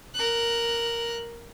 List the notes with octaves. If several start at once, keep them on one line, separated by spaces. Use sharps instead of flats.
A#4 F#6